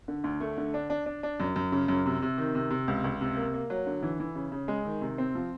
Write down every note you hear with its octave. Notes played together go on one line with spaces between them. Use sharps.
D3
D2
A3
D3
D4
D4
D4
D4
F#2
F#2
C#3
F#2
C3
C3
D#3
C3
C3
C#2
C#2
C3
A#3
A#3
F#3
D3
E3
E3
C#3
C#3
G#3
D#3
C3
C4
F3